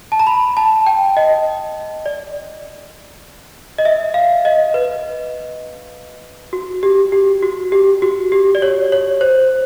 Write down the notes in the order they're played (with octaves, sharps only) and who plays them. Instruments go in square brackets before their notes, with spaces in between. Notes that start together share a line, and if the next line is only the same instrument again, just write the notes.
[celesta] A5
A#5
B5
A5
G5
D#5
D5
D#5
E5
F5
D#5
B4
F#4
G4
G4
F#4
G4
F#4
G4
D5
C#5
C#5
C5